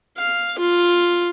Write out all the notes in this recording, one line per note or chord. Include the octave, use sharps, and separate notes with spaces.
F5
F4